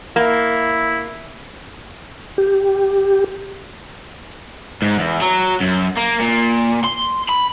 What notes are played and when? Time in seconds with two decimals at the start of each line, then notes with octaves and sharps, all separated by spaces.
0.16 A#3 E4
2.38 G4
4.82 G#2
4.99 E2
5.21 F#3
5.60 F#2
5.97 A#3
6.20 A#2
6.84 C6
7.29 B5